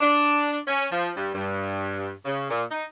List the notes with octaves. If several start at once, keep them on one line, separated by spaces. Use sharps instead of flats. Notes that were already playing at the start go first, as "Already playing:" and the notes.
D4
C#4
F3
G2
G2
C#3
A#2
D#4